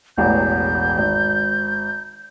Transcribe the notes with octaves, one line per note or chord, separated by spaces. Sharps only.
E1 A1 E2 G6
G#1